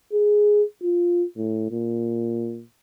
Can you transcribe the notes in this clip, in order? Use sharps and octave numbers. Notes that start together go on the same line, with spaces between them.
G#4
F4
A2
A#2